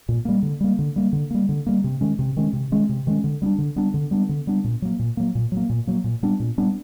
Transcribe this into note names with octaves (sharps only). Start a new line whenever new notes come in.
A#2
G3 A#3
D3
G3 A#3
D3
G3 A#3
D3
G3 A#3
D3
G3 A#3
C3
D#3 G#3 C#4
C3
D#3 G#3 C#4
C3
D#3 G#3 C#4
C3
D#3 G#3 C#4
D3
G3 B3 D4
D3
G3 B3 D4
D3
G3 B3 D4
D3
G3 B3 D4
A#2
F#3 A#3
A#2
F#3 A#3
A#2
F#3 A#3
A#2
F#3 A#3
A#2
G3 B3 D4
A#2
G3 B3 D4